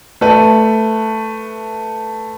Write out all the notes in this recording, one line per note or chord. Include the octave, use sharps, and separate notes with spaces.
A3 B4